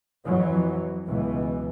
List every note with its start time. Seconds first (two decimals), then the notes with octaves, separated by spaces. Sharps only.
0.24 F2 E3 F#3
1.06 C#2 B2 E3